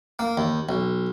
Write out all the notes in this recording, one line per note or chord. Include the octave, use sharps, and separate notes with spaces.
A#3
D#2
B1